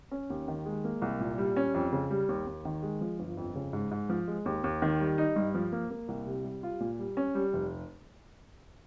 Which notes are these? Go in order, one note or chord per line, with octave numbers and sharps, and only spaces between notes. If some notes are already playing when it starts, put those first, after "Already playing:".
C#4
D#2
D#3
G#3
A#3
C2
A#2
G3
C#4
F2
C#3
G3
D#2
D#2
D#3
G#3
F3
G1
F2
C#3
G#2
G#2
F3
G#3
D#2
D#2
D#3
G3
D#4
G2
F3
A#3
A#3
C2
C3
G3
F4
A#2
G3
C#4
G3
F1